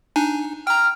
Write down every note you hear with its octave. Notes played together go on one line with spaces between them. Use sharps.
D4 D#4 G#5
G5 A#5 F6